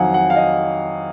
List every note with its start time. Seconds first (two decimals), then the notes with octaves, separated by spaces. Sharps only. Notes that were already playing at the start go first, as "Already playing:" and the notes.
Already playing: F2 D#3 F#3 F5 F#5 G#5
0.14 F#5
0.30 F5
0.36 D#5